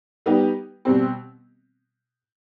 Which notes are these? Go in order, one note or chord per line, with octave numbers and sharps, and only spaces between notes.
G3 B3 D#4 G4
B2 G3 C4